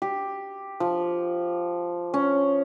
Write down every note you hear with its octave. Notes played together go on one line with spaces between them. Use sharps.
G4
F3
C#4